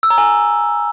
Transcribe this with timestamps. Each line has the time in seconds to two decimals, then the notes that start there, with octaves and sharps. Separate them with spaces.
0.03 E6
0.10 A#5
0.18 G#5